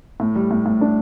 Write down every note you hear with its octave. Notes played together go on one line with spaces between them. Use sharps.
A2
G3
A2
A2
D4